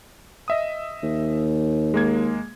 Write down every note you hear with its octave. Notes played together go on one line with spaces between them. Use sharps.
D#5 E5 D#6
D#2
G#3 A#3 G#6